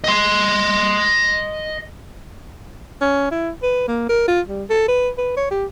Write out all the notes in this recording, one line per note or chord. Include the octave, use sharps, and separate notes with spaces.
D#5 C6
C#4
E4
B4
A#3
A#4
F4
G3
A4
B4
B4
C#5
G4